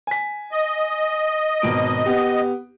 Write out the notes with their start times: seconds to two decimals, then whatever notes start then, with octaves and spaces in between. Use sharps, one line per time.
0.07 G#5 B6
0.52 D#5
1.62 G#1 B2 D7
2.06 B3 G4